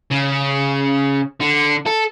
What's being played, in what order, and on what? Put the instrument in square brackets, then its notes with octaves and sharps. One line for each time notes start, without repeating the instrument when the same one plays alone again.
[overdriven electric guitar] C#3
D3
A4